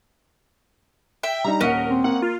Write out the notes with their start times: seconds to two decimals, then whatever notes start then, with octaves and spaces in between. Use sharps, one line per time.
1.23 E5 G5
1.44 G3 D4 D#4 A#5
1.61 D#1 C#4 A#4 D#5 F#5
1.90 C4
2.04 A#3 F#5
2.22 F4